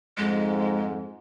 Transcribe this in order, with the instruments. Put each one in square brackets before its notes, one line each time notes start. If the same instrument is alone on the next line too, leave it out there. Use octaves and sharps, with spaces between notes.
[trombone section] F2 G#2 [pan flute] G#3